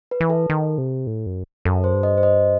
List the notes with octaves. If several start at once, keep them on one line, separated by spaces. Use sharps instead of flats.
B4
E3
A4
D#3
C3
A2
F#2
F#2 A4
C5
G2
D#5
C5
D#5